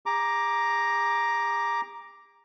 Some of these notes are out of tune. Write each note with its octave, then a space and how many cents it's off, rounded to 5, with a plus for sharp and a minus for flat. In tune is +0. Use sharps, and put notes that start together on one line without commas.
G#4 -45 A#5 +5 D6 +0